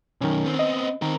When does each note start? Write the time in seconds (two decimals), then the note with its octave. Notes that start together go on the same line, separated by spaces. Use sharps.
0.21 B1 F#2 D#3 C#4
0.46 B3 C4
0.59 D#5
1.02 D#3 C4 A#4